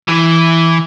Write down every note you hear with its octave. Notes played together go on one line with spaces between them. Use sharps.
E3